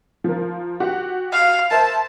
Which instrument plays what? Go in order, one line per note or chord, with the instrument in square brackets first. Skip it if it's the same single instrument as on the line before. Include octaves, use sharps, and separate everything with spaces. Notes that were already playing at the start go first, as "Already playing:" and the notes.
[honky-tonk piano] F3 A#4
F#4 G4
[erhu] F5
[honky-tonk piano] A#4 C5 E5 [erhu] A5